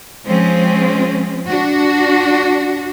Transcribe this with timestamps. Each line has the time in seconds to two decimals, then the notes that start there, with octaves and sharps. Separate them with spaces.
0.25 F3 G#3 C4 C#4
1.49 D4 F#4